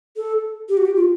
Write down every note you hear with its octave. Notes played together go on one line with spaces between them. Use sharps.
A4
G4
F#4
G4
F4